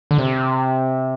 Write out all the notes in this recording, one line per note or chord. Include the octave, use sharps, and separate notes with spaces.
D3
C3